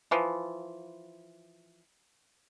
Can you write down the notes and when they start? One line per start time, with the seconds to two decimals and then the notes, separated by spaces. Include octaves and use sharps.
0.11 E3 F3